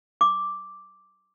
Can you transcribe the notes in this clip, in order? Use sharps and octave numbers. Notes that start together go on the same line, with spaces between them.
D6